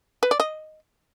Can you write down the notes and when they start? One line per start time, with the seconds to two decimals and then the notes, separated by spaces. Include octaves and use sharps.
0.23 B4
0.31 D5
0.40 D#5